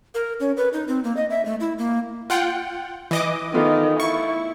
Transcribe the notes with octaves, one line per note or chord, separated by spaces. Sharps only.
A#4
C#4
B4
D#4
C4
A#3
D#5
E5
A3
E4
A#3
F4 F#5 G5
E3 D#5 D6
D#3 A3 B3 F4
E4 C#6